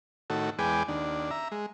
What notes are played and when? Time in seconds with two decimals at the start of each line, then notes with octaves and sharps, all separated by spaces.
0.30 A2 D#3 F#4 A4
0.59 E2 G#3 B4 G5 G#5 D6
0.88 D#2 D4
1.31 E5 A#5
1.51 G#3